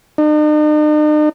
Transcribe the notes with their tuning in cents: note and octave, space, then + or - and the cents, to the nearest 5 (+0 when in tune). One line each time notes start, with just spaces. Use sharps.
D#4 -45